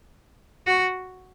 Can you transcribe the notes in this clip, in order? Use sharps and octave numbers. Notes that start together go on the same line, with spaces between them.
F#4